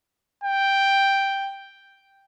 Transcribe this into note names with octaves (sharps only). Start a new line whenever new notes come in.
G5